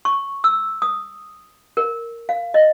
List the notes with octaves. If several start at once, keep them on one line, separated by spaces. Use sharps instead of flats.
C#6
E6
D#6
A#4
F5
D#5